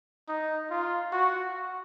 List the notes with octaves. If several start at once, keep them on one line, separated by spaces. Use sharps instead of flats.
D#4
F4
F#4